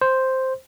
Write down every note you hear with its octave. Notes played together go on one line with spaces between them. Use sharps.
C5